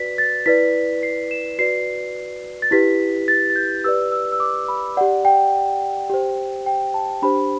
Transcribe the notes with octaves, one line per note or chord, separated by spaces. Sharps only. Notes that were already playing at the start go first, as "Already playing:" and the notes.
Already playing: F#4 B4 D5 B6
A6
E4 B4 D5 B6
C7
E7
F#4 B4 D5 C7
A6
E4 G4 B4 B6
A6
A6
G6
G4 B4 D5 E6
E6
E6
D6
B5
G4 D5 F#5
G5
G4 C5
G5
A5
D4 G4 C5 B5